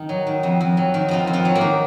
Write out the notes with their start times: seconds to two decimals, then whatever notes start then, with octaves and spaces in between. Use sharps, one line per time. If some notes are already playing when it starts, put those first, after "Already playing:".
Already playing: D#3 D#4
0.09 F#3
0.27 D#3
0.43 F2
0.61 F2
0.77 F#3
0.94 D#3
1.09 F2 F3 F4
1.27 F2
1.33 F3 F4
1.45 F#3
1.55 A#3 A#4
1.61 D#3